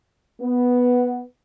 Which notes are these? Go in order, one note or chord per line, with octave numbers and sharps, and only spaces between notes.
B3